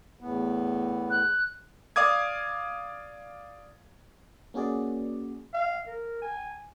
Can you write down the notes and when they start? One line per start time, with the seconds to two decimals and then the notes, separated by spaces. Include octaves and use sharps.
0.21 E2 A2 B3
1.10 F#6
1.96 D5 F5 D6 D#6 G#6
4.54 A#3 C#4 F#4 G#4 D5
5.54 F5
5.87 A#4
6.22 G#5